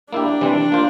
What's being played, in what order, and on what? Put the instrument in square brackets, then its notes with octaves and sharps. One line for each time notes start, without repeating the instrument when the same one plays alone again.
[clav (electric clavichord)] A#3 E4 G4 [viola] D4
[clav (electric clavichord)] C3 E3 G3 C4
A#3 F4 C5